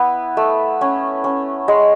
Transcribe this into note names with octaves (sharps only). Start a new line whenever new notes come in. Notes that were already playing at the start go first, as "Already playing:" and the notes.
Already playing: B3 E4
A3
C#4
C#4
G#3